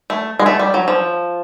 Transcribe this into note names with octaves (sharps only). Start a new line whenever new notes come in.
A3
G#3
A3
G3
F#3
F3